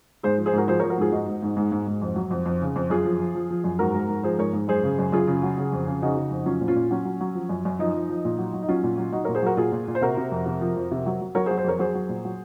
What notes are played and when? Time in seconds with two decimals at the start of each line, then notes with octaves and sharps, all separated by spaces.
0.23 G#2 G#4 C5
0.38 F3
0.46 G#4 C5
0.53 G#2 F#4 A#4
0.68 F3 G#4 C5
0.79 F3 A#4 C#5
0.90 F#4 A#4
0.98 G#2 F4 G#4
1.12 G#2 D#4 F#4
1.28 G#2
1.43 G#2
1.57 G#2
1.72 G#2
1.87 G#2
2.02 F2
2.16 F#3
2.31 F2
2.46 F2
2.62 C#3
2.76 F2
2.90 F#2 F4 G#4
3.05 F3
3.20 F3
3.35 F3
3.50 F3
3.64 F#2
3.79 G#2 F#4 A#4
3.95 G#2
4.09 G#2
4.23 F3 G#4 C5
4.38 G#2 A#4 C#5
4.53 G#2
4.68 F#2 G#4 C5
4.83 C#3
4.99 F#2
5.12 F#2 F4 G#4
5.27 C#3
5.43 F#3
5.58 C#3
5.73 F2
5.86 C#3
6.02 C#3 D#4 F#4
6.17 C#3
6.31 F2
6.46 F#3 C#4 F4
6.61 A#2
6.68 C#4 F4
6.75 A#2
6.91 F#3 C#4
7.05 F#3
7.21 F#3
7.35 F3
7.49 F#2
7.65 F#2
7.79 F3 D#4
7.94 F3
8.09 F3
8.25 A#2
8.38 F#3
8.54 F#3
8.63 D#4
8.68 F#3 C#4 F4
8.83 A#2
8.98 F#3
9.12 F#3 D#4 F#4
9.24 A#2 A#4 C#5
9.35 G#4 C5
9.42 F#3 F#4 A#4
9.57 A#2 F4 G#4
9.72 A#2
9.88 A#2
9.95 C5
10.01 C3 F#4 A#4
10.17 C3
10.32 F2
10.46 C3
10.61 F3
10.77 F2
10.91 C3
11.06 F#3
11.21 F#3
11.35 F#3 A#4 C#5
11.46 G#4 C5
11.51 F#3
11.58 G#4 C5
11.64 F2 A#4 C#5
11.79 F#3 G#4 C5
11.95 F#3
12.09 A#2
12.25 F#3